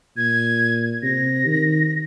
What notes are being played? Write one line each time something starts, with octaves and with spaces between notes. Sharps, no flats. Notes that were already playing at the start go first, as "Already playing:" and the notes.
A#2 G#6
C3 A#6
D#3